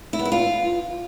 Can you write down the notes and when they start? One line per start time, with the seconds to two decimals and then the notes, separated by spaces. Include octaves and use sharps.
0.13 E4
0.19 B3
0.25 E4
0.32 F4